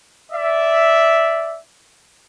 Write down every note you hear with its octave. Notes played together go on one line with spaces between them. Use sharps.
D5 E5